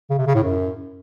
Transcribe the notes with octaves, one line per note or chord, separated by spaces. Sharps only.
C#3
C3
C#3
A2
F#2